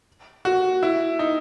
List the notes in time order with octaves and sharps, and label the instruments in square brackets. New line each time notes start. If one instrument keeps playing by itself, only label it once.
[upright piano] F#4
E4
D#4